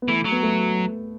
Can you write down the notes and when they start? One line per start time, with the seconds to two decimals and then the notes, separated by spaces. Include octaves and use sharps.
0.02 B3
0.08 E3 A3
0.25 F#3
0.32 B3
0.43 A3